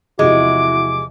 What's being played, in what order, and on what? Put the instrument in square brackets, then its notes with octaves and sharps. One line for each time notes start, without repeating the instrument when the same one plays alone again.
[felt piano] E2 C3 F3 [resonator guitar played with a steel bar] G#3 [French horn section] E4 F#4 [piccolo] D6